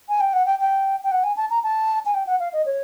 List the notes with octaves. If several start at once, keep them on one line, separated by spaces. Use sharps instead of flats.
G#5
G5
F#5
G5
G5
G5
F#5
G#5
A5
A#5
A5
G#5
G5
F#5
F5
D#5
C#5